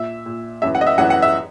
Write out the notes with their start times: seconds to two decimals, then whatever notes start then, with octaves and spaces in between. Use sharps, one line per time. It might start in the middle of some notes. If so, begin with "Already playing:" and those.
Already playing: A#2 E5
0.26 A#2
0.62 F#2 E3 E5
0.75 F#5
0.81 D#5
0.87 E5
0.98 F#2 E3 F#5
1.10 F#5
1.22 E5